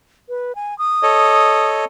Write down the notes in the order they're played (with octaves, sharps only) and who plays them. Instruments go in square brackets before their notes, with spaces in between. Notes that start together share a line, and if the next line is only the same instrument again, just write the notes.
[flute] B4
G#5
D#6
[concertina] A4 C#5 D#5